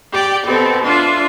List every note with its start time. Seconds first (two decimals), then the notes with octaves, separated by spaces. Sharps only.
0.11 G4 D5 G5
0.46 B2 C4 A4
0.84 D4 F4 E5